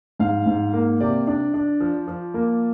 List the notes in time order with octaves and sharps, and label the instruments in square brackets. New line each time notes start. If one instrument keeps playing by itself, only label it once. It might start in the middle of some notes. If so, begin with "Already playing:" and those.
[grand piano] G#2 F5
G#2
A#3
C3 D5
D4
D4
F3
F3
A#3